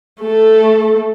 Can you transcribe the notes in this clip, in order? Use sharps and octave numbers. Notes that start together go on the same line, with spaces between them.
A3 A4